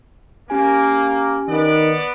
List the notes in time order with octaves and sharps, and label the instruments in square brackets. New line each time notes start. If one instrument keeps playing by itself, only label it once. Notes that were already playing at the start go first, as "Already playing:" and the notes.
[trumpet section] A#3 [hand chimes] C#4 G4 G#5
[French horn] D#3 [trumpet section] B3 D5